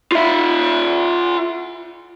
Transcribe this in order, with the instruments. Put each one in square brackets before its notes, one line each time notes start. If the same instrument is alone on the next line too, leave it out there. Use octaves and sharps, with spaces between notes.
[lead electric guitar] F4 E5